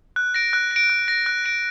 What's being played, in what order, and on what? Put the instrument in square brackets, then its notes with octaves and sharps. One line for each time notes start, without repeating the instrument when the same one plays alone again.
[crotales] F#6
A#6 D7
F#6
A#6 D7
F#6
A#6 D7
F#6
A#6 D7